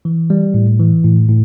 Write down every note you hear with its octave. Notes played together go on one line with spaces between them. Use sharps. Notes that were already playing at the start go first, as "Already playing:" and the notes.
E3
G3
A2
E3
A2
A2